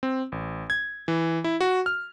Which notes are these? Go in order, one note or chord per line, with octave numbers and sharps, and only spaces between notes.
C4
A1
G#6
E3
E4
F#4
F6